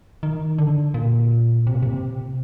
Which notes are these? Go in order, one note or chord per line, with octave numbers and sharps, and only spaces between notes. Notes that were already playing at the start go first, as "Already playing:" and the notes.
D#3
D3
A#2
C3
A#2
C3